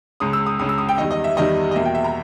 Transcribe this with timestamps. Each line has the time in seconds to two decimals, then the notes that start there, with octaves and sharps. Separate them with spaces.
0.20 C#2 C#3 G#3 D#6
0.33 E6
0.46 D#6
0.59 C#2 C#3 G#3 D#6
0.69 E6
0.78 D#6
0.89 G5
0.98 E2 D#3 G3 D#5
1.11 D#5
1.24 E5
1.37 E2 D#3 G3 D#5
1.71 D#5
1.75 E2 B2 A#3 E5
1.85 G5
1.95 E5
2.04 A#5